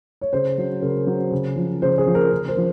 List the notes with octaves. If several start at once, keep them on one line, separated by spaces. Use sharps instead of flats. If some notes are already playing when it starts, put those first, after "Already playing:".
C#5
C#3 C5
F#3
C#3 A#4
F#3
C#3
F3
C#3 C5
G#4
F3
A#4
C#3 A#4
C5
F3